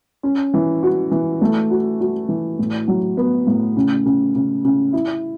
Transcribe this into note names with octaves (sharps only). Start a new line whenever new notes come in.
C#4
E3
F#4
E3
A3
F#4
F#4
E3
A2
F#3
B3
A2
C#3
C#3
C#3
C#3
E4